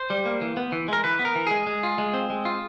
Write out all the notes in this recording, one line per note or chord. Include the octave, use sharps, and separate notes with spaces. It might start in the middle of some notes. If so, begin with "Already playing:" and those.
Already playing: C5
G3
A#3
E3
B3
E3
G#3 A#4
E3 B4
B3
A#4
E3
G#3 G#4
G#3
F4
G#3
C4
G#3
F4